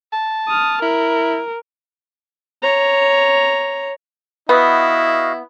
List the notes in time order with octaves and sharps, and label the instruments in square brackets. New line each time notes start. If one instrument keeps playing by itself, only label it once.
[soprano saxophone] A5
[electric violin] D#6 F6
[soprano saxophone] E4 [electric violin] A#4
[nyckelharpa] C#5 A#5
[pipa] B3 [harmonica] E4 [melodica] F#4 D#5 F5